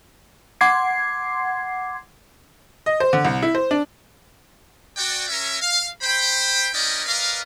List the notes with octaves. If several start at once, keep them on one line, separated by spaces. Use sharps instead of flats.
F#5 C6 D6 G#6 C7
D#5
C5
D3
C2
E4
C5
D4
F#4 D5 G5
C#4 A#4 E5
F5
C5 G5 B5
C#4 E4 A#4 D5 D#5 G5
A#4 B4 D5 D#5 F5